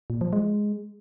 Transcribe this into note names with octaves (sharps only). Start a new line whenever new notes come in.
A#2
F3
G#3